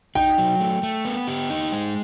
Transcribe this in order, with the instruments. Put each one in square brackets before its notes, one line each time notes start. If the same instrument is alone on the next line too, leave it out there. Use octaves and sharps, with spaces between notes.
[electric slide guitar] D#4 [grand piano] G5
[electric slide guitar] F#3
A3
A3
B3
G4
D#4
G#3